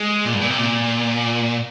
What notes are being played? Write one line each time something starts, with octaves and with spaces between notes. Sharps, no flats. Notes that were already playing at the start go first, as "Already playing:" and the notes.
Already playing: G#3
A#2
G2
A#2
C3
A#2